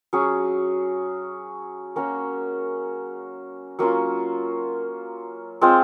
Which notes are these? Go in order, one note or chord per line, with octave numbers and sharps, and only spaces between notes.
F#3 C#4 G#4
A#3 C#4 F#4 A#4
F#3 A#3 C#4 F4
G#3 C4 F4 C5